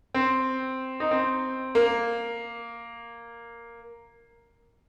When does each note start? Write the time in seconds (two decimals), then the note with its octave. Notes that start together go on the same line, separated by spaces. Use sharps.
0.14 C4
1.00 D#4
1.11 C4
1.75 A#3